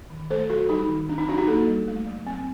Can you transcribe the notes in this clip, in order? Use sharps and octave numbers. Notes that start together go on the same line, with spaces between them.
D#3
A3 A4 C5
F#3 F#4 A4
G3 D#4 G4
D#3
C4 D4
D#4
F#3 D4 F#4
D#4 G4
A#3 F#4 A4
G3
A3
F#3
C4